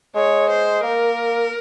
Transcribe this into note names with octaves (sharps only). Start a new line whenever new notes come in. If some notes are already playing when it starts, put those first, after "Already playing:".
G#3 C#5
C5
A#3 A#4